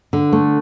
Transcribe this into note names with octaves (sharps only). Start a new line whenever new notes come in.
D3
A3